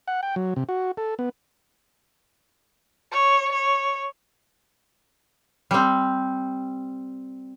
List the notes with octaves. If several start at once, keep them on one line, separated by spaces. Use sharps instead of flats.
F#5
G5
F#3
C3
F#4
A4
B3
C#5
C#5
G3 C4